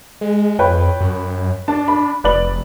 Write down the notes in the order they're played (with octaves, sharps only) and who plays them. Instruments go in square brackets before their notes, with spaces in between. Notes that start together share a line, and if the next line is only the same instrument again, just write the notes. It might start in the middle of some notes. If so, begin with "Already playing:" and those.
[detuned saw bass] G#3
[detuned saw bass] F2 [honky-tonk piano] B4 C#5 G5
[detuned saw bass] F#2
[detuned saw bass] D4 [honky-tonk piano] A5
[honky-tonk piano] B5
[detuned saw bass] F1 [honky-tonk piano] B4 D5 F#7